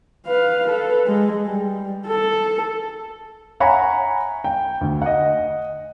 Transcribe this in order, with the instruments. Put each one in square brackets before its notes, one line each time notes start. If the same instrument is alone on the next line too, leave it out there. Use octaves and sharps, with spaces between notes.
[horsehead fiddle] B4 F5
A4 B4
G#3
G3
A4
[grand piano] C#5 E5 F#5 G#5 A#5 B5
G5
D2
D#5 F#5